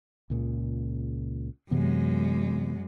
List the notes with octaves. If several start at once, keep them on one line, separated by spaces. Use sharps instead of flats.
C#2 A#2 C#3
F#2 C3 E3 G#3 B3